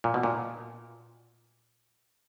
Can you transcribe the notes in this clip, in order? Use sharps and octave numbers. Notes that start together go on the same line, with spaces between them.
A#2
B2
A#2